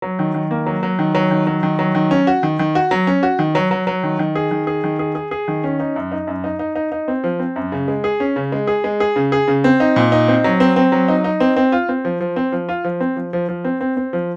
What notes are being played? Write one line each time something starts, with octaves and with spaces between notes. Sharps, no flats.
F#3
D#3
D#3
A#3
F#3
F#3
D#3
F#3
D#3
F#3
D#3
F#3
D#3
C#4
F#4
D#3
D#3
F#4
F#3
C#4
F#4
D#3
F#3
F#3
F#3
D#3
D#3
G#4
D#3
G#4
D#3
G#4
G#4
G#4
D#3
C#4
D#4
F#2
D#4
F#2
D#4
D#4
D#4
D#4
C4
F3
C4
F#2
C#3
G#3
G#4
C#4
C#3
G#3
G#4
G#3
G#4
C#3
G#4
C#3
C4
D#4
A#2
D#4
C4
F#3
C4
C4
F#3
D#4
D#4
C4
C4
F4
C4
F3
F3
C4
F3
F4
F3
C4
F3
F3
F3
C4
C4
C4
F3